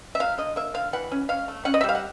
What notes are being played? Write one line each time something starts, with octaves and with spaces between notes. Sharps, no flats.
E5
F#3 F5
D3 D#5
A#3 E5
D3 F5
E3 F#5
C#4
C#4 F5
A3
C#4 F#5
D#5
E5
G3
F5
F#5